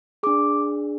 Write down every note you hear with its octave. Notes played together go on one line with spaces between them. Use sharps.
D4 G#4 D6